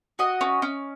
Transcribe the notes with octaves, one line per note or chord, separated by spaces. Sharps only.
F#4 D#5
C#4
C#4